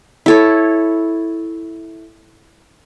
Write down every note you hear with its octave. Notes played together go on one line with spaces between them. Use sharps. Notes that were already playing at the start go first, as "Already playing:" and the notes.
E4 A4 C#5